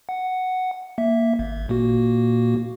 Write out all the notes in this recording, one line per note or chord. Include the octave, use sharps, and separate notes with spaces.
F#5
A#3 E5
G#1
A#2 A#3 F#4